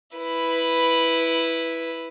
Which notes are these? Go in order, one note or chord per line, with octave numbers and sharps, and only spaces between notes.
E4 B4